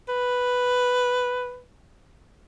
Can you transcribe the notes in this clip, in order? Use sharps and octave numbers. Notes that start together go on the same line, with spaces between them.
B4